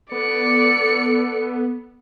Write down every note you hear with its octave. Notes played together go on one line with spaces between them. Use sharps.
B3 A4 D5 C#7